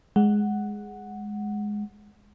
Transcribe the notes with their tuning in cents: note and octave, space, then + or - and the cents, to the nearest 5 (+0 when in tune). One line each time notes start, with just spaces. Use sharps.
G#3 +0 F#5 +0